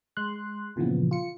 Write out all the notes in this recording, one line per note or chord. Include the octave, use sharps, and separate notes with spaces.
G#3 C6 F#6
G2 A#2 C#3 E3 F3 B3
F4 C#7